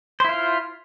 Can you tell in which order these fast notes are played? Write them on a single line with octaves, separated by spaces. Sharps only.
C5 E4 F4